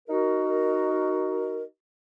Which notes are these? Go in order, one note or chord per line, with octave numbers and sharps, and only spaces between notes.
D#4 F#4 A#4